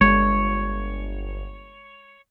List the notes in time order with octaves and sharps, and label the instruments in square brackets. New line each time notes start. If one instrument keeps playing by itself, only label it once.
[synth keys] G1 [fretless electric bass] G#3 [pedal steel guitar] C#5